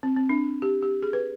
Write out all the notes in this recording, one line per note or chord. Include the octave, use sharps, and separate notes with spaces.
C4
C4
D4
G4
G4
G#4
B4